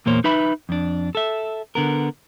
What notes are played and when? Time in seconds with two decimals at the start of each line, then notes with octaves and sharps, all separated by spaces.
0.06 E2 A#2 A#3 C5 C#5
0.24 D#4 B4 E5 B5
0.69 F2 D4
1.15 A4 E5
1.75 D3 B3 A#4